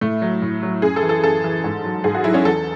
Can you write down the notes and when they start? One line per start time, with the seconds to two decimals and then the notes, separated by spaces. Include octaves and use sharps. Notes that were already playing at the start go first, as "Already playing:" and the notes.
0.01 A2 A3
0.22 F#3
0.42 A2
0.63 F#3
0.82 F#2 G#4
0.96 A4
1.03 E3
1.09 A4
1.23 F#2 A4
1.44 E3
1.64 G#2
1.84 F#3
2.04 G#2 G#4
2.15 F#4
2.24 F#3 E4
2.34 C#4
2.45 E2 A4